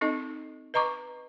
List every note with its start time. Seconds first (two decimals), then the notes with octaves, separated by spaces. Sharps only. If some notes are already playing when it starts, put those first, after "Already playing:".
0.01 C4 D#4 A4 D#5
0.74 B4 D#5 A#5 C#6 D6